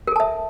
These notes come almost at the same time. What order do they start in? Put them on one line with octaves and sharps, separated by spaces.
A#4 A4 A5 E5